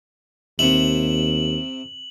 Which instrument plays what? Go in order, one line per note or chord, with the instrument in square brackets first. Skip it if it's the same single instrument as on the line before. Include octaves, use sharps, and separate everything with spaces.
[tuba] D#2 [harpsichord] C3 E4 [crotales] F#7